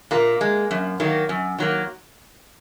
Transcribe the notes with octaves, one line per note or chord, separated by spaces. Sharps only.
A#2 A#3
G#3
F#2
D#3 F#3 A#3
F#2
D#3 F#3 A#3